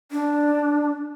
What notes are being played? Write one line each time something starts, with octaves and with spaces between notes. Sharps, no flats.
D4